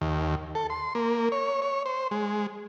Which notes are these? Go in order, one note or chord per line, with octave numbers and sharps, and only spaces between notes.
D#2
A4
C6
A#3
C#5
C#5
C5
G#3